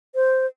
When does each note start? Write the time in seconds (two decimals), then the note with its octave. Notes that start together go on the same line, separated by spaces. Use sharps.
0.15 C5